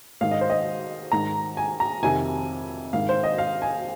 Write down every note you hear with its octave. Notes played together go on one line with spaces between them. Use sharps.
G#2 D#3 F5
D#5
C5
D#5
G#2 D#3 A#5
G#5
A#5
F2 C3 D#3 G#5
G#2 D#3 F5
C5
D#5
F5
G#5